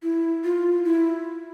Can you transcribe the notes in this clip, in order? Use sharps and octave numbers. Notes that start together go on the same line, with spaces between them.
E4
F4
E4